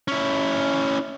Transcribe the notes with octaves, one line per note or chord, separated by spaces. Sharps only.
C#4 E4